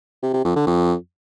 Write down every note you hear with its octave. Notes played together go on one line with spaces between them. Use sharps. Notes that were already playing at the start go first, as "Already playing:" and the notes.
C3
C3
F2
D3
F2